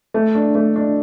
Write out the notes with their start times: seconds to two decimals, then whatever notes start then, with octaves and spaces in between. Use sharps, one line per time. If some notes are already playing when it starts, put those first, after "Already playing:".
0.14 A3
0.35 D4
0.55 A3
0.76 D4